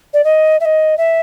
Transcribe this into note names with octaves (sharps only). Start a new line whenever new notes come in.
D5
D#5
E5
D#5
E5